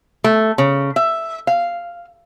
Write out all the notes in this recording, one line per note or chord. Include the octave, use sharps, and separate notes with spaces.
A3
C#3
E5
F5